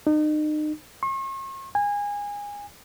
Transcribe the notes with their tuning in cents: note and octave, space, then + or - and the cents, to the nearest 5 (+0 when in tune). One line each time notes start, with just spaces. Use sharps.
D#4 -35
C#6 -45
G#5 -25